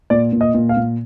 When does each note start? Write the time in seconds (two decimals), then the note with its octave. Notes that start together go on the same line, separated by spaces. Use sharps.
0.10 A#2 D5
0.33 A#2
0.41 D#5
0.55 A#2
0.69 F5
0.77 A#2